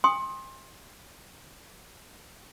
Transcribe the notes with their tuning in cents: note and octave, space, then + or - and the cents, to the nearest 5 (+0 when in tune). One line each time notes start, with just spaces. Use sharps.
G#5 -45 C6 +25 D#6 +0